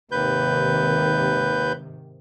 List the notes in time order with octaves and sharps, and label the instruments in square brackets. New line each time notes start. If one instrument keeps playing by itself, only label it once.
[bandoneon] D#2 B4 G6 [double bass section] G#2 C3 D#3